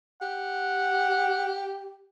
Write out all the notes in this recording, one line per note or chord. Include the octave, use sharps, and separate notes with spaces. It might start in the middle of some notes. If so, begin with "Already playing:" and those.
G4 F#5